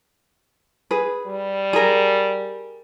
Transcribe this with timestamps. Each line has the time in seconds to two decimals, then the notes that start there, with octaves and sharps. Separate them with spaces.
0.91 G#4 B4
1.26 G3
1.73 G#4 A#4